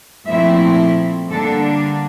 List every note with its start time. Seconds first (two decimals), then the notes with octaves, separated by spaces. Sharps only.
0.26 A#2 F3 A3 C4 E4 E5
1.30 D3 G3 A#3 D4 A4